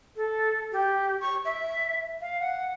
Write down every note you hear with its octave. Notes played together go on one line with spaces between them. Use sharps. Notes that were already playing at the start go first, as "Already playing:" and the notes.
A4
G4
C#6
E5
F5
F#5